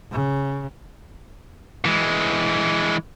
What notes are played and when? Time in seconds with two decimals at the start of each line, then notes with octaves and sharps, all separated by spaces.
0.11 C#3
1.85 E3 G#3